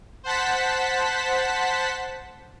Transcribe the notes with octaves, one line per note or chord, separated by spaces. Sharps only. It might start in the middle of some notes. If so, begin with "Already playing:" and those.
C5 F#5 A5 B6